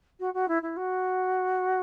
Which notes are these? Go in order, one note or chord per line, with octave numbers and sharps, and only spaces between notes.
F#4
F#4
E4
E4
F#4